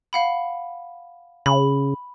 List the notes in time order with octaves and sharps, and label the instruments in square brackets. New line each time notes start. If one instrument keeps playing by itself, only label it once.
[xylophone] F5 F#5 B5
[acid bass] C#3 [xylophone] B5